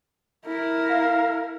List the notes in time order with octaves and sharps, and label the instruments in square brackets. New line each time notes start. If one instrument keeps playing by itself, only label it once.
[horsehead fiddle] E4 A#4
[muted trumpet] F5